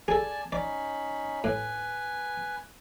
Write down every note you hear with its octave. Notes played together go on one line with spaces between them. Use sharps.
G#4 A4 D5 G#5 A5
C#4 D#4 D5 B5
A2 B4 G#5